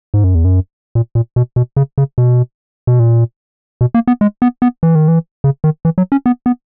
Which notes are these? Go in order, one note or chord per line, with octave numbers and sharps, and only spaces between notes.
G#2
F#2
E2
F#2
A#2
A#2
B2
B2
C#3
C#3
B2
B2
A#2
B2
A#3
B3
G#3
B3
B3
E3
D#3
E3
C#3
D#3
E3
F#3
C#4
B3
B3